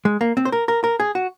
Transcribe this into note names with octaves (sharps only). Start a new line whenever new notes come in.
G#3
A#3
C4
C5
A#4
A#4
A#4
G#4
F#4